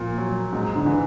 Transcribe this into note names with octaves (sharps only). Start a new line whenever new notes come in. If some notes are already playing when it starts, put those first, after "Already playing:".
Already playing: A#2 F3
F#3
G#2
D3
E3